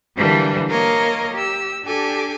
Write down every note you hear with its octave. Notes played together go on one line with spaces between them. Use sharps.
D3 E3 F#3 G3 A#3 D4
A#3 A#4 C#5 D#5 F5
G4 E6
D4 G4 A4 G#5 D6